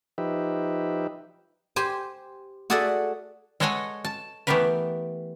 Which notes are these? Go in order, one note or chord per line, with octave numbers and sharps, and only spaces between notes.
F3 D#4 G4 B4 E5
G4 C5 G#5
F#4 G#4 A4 D5 E5 F#5
G#3 A4 C#5 D#5 F#5 G#5
A5
E3 A3 B3 G4 A#4 B4